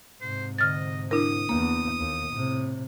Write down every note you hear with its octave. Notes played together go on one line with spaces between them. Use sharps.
G#2 C3 C5
D3 D#5 F6 A6
D4 E4 A#4 D#6
E2 A#3
D#2
A2 C3